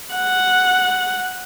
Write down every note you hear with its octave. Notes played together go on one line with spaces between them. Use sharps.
F#5